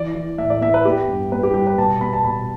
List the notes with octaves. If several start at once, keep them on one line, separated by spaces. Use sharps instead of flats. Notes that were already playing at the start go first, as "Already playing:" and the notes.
Already playing: E3 D5
E3
A2 E5
D5
B3 E5
B4
B3 G4
G2
B3 B4
G4
G3 G4
B4
B2 A5
B3 B5
A5
B2 B5